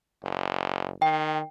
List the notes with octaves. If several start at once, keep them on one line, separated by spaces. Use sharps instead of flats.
F#1
D#3 G5